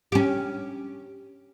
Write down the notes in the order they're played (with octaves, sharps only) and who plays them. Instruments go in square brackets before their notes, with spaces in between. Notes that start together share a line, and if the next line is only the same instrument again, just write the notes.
[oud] C#4 G4